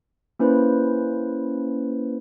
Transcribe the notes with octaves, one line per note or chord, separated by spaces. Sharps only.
A#3 C#4 E4 B4 C5